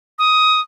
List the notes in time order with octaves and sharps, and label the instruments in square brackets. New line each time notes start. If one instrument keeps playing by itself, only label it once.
[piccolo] D#6